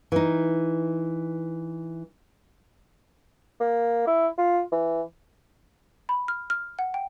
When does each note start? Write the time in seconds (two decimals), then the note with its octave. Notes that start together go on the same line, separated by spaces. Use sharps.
0.12 E3 D#4
3.60 A#3
4.07 E4
4.38 F4
4.72 E3
6.09 B5
6.28 F6
6.50 F6
6.79 F#5
6.94 G5